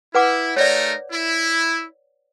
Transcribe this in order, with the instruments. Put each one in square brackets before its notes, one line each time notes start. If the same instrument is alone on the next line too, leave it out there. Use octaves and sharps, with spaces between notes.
[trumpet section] E4 [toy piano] B4 F#5 D6
[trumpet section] A3 D#4 A#4 [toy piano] C#5 D5
[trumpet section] E4